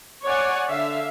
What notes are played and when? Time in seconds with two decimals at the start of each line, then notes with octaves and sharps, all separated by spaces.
0.24 C#5 D5 F#5 G#5
0.69 D3 E5 F5